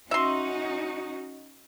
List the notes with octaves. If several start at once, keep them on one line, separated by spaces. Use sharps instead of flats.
C#4 D#4 F#4 E5 C6